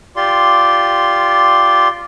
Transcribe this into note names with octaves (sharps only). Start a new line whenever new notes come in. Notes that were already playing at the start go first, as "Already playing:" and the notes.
F4 G4 D5 C6